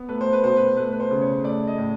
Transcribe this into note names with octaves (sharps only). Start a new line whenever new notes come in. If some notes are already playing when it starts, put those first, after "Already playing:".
Already playing: B3
A3 B4
C5
B4
B2 C5
B4
A3 B4
B4
C5
C#3
C#5
A3 D5
D#5
A2